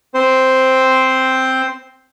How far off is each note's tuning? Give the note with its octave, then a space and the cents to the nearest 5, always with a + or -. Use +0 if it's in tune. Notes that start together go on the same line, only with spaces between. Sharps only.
C4 +0 C5 +0